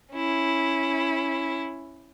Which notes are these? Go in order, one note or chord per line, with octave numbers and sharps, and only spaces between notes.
C#4 E4